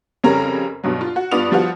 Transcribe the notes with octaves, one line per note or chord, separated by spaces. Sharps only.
F2 C#3 G3 C#4 A#4 A#5
G2 B2 F#3
F4
F#4
G2 B3 F4 D5 D#6 F7
F3 G3 B3 F4 F#4